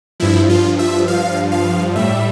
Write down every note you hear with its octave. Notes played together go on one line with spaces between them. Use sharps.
G2 F3 E4
F4
E5
F5
F5
A2 G3 E5